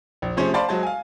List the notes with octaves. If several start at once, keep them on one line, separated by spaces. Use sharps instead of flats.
A#1
C3 F3 A3 C#4 G#4 C5
C5 D5 F5 A5 B5 C6
F#3 G#3 C5 A5
F5 G#5